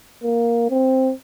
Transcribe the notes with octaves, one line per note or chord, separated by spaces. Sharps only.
A#3
C4